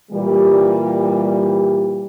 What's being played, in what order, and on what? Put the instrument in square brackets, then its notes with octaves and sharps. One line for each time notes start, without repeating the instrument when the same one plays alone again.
[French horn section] A#2 E3 G3